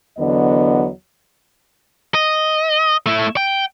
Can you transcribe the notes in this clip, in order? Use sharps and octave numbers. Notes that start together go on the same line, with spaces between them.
E2 D3 F#3 B3 D#5
D#5
A3 E4
G5